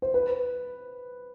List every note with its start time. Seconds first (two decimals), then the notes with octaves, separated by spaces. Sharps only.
0.02 C5
0.14 B4